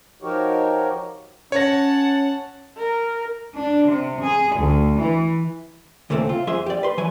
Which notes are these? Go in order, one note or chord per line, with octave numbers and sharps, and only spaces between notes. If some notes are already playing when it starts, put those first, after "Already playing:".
F3 D#4 F#4 G4 A#4 C#5
C#4 C#5 F#5 A5 A#6
A#4
D4
C3
G#4
D2
E3
D#2 A#2 C#3 A3 C4
F4
F2 G#4 E5 C6
G4 D5
B4 C6
E3 F#3 B4 G#5